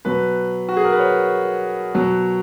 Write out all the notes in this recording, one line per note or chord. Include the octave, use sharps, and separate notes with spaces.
B2 F#3 B4
F#4
G#4
A#4
B4
C#5
B2 F#3